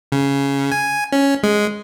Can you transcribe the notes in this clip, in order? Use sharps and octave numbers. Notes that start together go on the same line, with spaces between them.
C#3
G#5
C#4
G#3